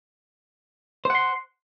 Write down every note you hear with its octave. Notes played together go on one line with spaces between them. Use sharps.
C5 F#5 C6